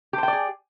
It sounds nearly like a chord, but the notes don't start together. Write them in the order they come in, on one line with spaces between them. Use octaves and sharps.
G4 C5 G5 D5 G#4